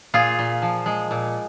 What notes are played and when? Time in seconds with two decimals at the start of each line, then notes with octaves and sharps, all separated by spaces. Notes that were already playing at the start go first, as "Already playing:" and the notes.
0.14 A#2 F4 G#4
0.39 A#2
0.62 F3
0.86 G#3
1.11 A#2